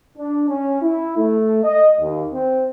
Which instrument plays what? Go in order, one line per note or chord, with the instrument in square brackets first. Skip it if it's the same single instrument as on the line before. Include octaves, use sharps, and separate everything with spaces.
[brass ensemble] D4
C#4
E4
A3
D#5
D#2
C4